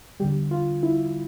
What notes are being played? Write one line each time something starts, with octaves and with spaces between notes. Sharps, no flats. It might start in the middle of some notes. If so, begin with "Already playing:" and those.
E2 D3 G3 G4
F4
E4